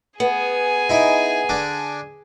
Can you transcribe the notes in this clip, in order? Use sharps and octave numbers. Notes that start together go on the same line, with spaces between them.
B3 G#4 G#5
D#4 E4 B5
D3 D4 D6